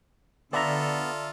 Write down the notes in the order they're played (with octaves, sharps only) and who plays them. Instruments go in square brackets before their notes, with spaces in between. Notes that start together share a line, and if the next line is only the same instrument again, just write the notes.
[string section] D3 [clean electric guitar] B3 [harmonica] F4 A4 [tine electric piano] D5 E5 A#5